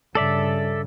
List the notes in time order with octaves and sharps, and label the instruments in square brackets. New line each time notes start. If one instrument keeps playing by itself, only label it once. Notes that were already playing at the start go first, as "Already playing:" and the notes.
[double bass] G2 C#3 [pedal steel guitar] A4 D5 E5